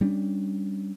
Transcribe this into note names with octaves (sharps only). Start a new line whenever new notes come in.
G3 C#4 D4